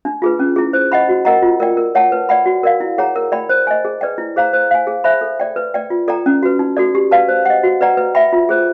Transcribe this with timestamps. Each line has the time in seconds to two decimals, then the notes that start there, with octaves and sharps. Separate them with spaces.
0.05 D4
0.22 F4 G#4 B4
0.39 C#4
0.56 E4 G#4
0.73 C5
0.92 D#5 F#5 B5
1.09 F#4
1.25 A#4 D#5 F#5 A#5
1.42 F4
1.60 A#4 D5 G5
1.77 A#4
1.95 C#5 F#5 A5
2.12 B4
2.29 D5 F#5 B5
2.46 F#4
2.63 A#4 D5 F5
2.80 E4
2.98 G#4 C#5 F#5 A#5
3.16 A#4
3.32 D5 G5 B5
3.49 C5
3.67 D#5 G#5
3.85 G#4
4.01 B4 D5 G5
4.18 E4
4.36 G#4 C5 F5 A#5
4.53 C5
4.71 F5 G#5
4.87 G#4
5.04 C5 E5 G#5 B5
5.21 A4
5.40 D5 G5
5.56 B4
5.74 D5 G5
5.90 F4
6.08 A4 D5 G5 A#5
6.26 C#4
6.43 F#4 B4
6.59 D#4
6.77 F#4 A4 D5
6.95 G4
7.11 B4 D5 F5 A5
7.28 C5
7.45 D#5 F#5
7.63 F#4
7.81 B4 D5 F#5 A#5
7.97 B4
8.15 E5 G5 B5
8.33 F4
8.49 G#4 C5